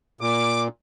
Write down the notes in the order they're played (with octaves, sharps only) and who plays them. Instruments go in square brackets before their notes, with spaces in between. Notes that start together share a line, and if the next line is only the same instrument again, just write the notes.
[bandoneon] A#2 [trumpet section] D6